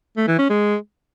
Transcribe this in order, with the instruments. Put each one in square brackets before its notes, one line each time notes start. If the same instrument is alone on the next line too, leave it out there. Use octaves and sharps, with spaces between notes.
[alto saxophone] A3
E3
C#4
G#3